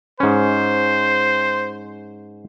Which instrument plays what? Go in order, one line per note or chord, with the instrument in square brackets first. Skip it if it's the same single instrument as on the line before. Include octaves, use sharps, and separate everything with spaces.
[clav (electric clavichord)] G#2 C#4 [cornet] C5